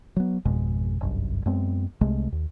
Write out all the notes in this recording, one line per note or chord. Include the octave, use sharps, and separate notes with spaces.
F#3 B3
G#1 F2 B2 G#3
G1 C2 F#2
F#2 G#3 B3 C4
C2 C3 G#3 A3
D#2